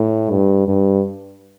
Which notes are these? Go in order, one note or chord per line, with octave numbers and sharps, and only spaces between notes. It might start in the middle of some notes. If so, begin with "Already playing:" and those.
Already playing: A2
G2
G2